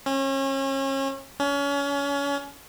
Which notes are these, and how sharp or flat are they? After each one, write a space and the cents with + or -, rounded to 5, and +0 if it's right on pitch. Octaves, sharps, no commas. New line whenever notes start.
C#4 -35
C#4 +30